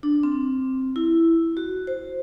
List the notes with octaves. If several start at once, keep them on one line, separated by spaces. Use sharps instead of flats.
D4
C4
E4
F#4
C5